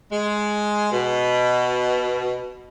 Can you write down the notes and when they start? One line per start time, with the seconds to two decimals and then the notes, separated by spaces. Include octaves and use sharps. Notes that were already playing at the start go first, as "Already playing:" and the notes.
0.11 G#3
0.92 B2